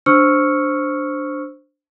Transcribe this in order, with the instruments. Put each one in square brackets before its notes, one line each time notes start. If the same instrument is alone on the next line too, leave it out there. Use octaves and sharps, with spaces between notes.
[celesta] D4 C5 C#6 E6 F6 C#7